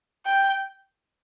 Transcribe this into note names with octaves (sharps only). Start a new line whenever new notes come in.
G5